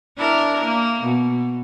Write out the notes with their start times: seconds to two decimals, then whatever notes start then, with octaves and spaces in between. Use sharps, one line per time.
0.17 D4 E4 A#4
0.65 A#3
1.03 B2